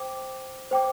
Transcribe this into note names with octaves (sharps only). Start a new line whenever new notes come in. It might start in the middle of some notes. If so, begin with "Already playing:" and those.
Already playing: C5 G5 D6
C5 G5 D6